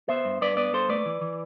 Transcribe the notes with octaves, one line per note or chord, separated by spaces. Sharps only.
B3 C5 E5
G2
G2 B4 D5
B3 B4 D5
G2 A4 C5
A3 B4 D5
E3
E3